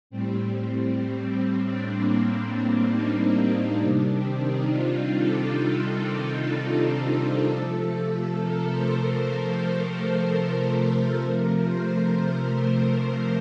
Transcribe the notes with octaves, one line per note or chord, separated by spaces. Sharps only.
A2 G3 C4
C4
C4
D4
A#3
C4
C4
D#4
C3 D#3 G3 D4
C4
D#4
F4
A4
F4
D#4
F4
A4
C3 F3 A3
A#4
C5
C5
A#4
C5
A#4
A#4
C5
C3 F3 A3 A#4
C5